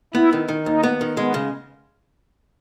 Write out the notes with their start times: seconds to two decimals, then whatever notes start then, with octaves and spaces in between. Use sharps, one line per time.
0.14 B3 E4
0.33 D#3
0.48 D#3
0.66 D#2 D#4
0.83 B3
1.01 D#3
1.17 G#3 B3
1.34 C#3